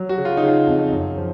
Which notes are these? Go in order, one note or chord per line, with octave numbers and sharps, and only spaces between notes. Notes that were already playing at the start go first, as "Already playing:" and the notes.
Already playing: F#3
F#4
C#3
F4
D#4
C#3 F4
F2
F#2
F3